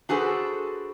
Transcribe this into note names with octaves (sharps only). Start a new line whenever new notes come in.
D4 F#4 G#4 A4 B4 C5